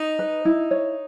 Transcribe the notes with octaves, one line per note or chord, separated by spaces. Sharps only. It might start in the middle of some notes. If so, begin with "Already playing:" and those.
Already playing: D#4
B4
E4
C#5